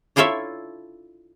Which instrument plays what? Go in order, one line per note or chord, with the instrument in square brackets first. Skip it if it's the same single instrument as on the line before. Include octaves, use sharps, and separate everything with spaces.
[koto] D4 E4 F4 A4 C#5 E5